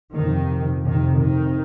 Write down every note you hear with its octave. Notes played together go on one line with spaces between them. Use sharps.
F2 C3 D#3
F2 C3 D#3
D#3